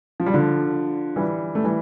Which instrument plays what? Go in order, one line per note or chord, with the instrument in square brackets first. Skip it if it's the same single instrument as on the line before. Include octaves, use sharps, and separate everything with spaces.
[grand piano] F3
G3
D3 F3
E3 G3
A3
E3 G3